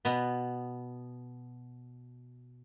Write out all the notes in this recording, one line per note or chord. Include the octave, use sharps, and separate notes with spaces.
B2 B3